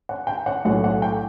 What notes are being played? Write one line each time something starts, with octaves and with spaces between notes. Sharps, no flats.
F#5
G5
F#5
B1 A2 F#3 F#5
F#5
G5